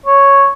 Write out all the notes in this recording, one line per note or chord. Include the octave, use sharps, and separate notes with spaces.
C#5